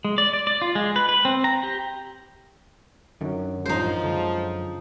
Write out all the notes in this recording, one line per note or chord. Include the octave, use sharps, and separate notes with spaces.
G#3
D5
D5
D5
F4
G#3
B4
B4
C4
A#5
G4
F#2 D3 D#3 F#3
A1 G2 F3 D#4 C5
D3 G#3